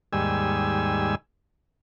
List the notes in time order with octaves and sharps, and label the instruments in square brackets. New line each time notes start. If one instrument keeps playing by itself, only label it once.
[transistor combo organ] D#2 G#2 G3 G#5 E6